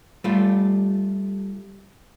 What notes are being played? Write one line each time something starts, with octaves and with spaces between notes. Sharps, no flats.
G3 A3 F4